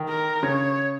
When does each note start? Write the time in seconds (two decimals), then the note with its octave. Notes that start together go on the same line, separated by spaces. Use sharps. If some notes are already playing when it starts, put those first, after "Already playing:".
Already playing: D#3
0.08 A#4
0.42 C#3 C#5